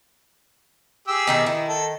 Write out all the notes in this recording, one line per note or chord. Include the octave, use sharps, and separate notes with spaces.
G4 G#4 E6
B2 D#3 D#4
D#3 E4
A4